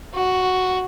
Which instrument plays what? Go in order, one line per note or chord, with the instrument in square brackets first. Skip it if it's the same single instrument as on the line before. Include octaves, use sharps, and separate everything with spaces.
[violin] F#4